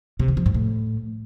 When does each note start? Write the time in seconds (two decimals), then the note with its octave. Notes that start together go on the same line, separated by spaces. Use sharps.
0.19 C3
0.28 D#3
0.37 F3
0.46 G#2
0.54 A2